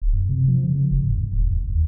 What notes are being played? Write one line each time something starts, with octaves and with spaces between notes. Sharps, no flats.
D1
F#2
C3
F3
C#3
F#1
G#2
E2
E1
E2
D#2